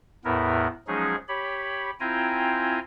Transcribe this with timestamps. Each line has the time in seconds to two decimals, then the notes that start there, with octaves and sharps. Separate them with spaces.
0.25 E2 A2 B3 E4 A#4
0.87 F3 F#3 G#3 C#4 D#4 G#4
1.28 G4 C#5 B5
2.00 C4 E4 F4 G5 G#5 A#5